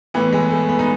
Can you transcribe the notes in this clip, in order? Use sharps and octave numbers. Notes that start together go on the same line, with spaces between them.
A2 E3 B3
G#3
A3
B3
D#4